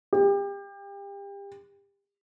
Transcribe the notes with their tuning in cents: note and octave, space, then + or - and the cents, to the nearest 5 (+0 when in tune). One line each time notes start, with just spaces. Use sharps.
G4 +30